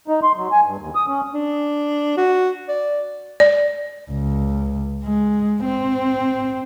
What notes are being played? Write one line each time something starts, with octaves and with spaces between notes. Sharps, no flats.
D#4
C6
F#3
G#5
G2
D#2
D#6
C#4
D4
F#4
D5
D5
C#2
G#3
C4